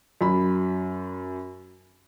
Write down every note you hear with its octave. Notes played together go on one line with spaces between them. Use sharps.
F#2 B5